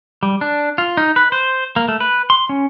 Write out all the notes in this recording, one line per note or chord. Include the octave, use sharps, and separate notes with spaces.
G3
D4
F4
D#4
B4
C5
A#3
A3
B4
C6
C#4